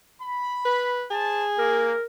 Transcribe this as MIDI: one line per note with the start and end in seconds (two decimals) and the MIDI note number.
0.22 0.95 83
0.65 1.04 71
1.11 2.00 68
1.11 1.45 72
1.11 1.45 81
1.58 1.93 58
1.58 2.05 70